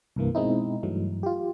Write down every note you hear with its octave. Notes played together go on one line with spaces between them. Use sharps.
C2 G2 E3 A#3
B2 G#3 C4 D#4 E4
G2 E3 F#3 A3
F4 G4